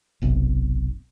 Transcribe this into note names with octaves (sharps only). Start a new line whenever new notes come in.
F#1 B1 C3